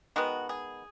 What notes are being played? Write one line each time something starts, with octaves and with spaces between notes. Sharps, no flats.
D#3 G#3 B3 F#4
G#4